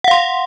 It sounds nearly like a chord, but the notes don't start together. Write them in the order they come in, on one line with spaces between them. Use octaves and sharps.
F#5 F5 C6